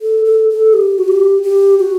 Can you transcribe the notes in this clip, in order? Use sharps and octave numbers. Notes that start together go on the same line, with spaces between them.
A4
A4
A4
G4
F#4
G4
G4
F#4